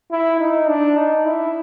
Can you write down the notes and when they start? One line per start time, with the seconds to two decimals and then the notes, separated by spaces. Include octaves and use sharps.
0.12 E4
0.40 D#4
0.68 D4
0.97 D#4
1.25 E4